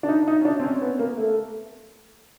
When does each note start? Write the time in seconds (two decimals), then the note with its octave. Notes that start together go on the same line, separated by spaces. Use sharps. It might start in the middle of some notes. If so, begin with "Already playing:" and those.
0.03 D4
0.09 D#4
0.28 D#4
0.41 C#4
0.45 D4
0.60 C4
0.63 C#4
0.82 B3
0.99 A#3
1.18 A3